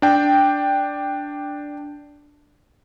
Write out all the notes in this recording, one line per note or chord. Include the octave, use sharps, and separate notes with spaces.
D4 G5